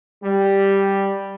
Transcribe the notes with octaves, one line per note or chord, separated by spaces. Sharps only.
G3